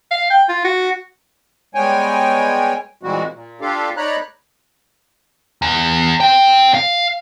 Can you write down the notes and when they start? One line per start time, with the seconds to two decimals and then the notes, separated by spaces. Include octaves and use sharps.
0.11 F5
0.30 G5
0.49 F4
0.64 F#4
1.75 G3 G#3 B3 C#5 G5 G#5
3.03 A#2 E3 G3 G#3 C4 F#4
3.33 A#2
3.61 D4 F4 G4 A4 F5
3.97 D#4 C#5 D5 A#5 B5 F#6
5.62 E2
6.21 C4 G5
6.74 F5